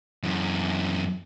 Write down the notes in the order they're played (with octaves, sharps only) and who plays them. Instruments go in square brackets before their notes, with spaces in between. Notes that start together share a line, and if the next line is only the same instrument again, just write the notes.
[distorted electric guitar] F#2 E3